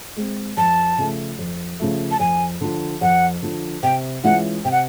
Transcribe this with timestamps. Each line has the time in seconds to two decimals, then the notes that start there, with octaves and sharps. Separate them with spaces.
0.16 G#3 C4
0.57 F2 A5
0.98 C#3 F3 A3
1.39 F2
1.80 C#3 F3 A3
2.11 A5
2.20 F2 G#5
2.61 D3 F3
3.01 F2 F#5
3.42 D3 F3
3.83 C3 G5
4.23 E3 G#3 C#4 F4 F#5
4.65 C3 G5
4.71 F#5